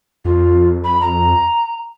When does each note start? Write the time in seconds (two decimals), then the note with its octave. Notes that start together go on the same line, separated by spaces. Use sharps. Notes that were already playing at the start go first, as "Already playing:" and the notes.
0.25 F2 F4
0.84 B5
1.01 A#5